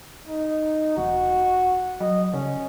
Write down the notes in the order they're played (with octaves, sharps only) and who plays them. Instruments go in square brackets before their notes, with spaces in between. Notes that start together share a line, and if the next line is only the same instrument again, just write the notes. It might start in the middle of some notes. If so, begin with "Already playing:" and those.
[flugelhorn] D#4
[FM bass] E1 [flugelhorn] F#4
[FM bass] F#3 [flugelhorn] D#5
[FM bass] C#3 [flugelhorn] C#4